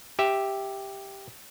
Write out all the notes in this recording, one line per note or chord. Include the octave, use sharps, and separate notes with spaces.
G4 E5